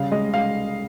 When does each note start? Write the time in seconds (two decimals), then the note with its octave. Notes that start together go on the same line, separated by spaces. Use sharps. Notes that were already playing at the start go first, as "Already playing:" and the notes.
Already playing: C#3 G3 F5
0.12 G#3 D#5
0.34 G#3 F5